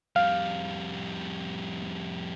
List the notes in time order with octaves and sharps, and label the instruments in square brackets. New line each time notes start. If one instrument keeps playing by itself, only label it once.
[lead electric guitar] F2 G3 [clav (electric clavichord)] F5